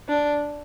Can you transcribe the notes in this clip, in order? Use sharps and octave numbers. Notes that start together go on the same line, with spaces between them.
D4